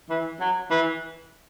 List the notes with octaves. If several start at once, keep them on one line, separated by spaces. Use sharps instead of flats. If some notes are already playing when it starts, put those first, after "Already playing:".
E3
F#3
E3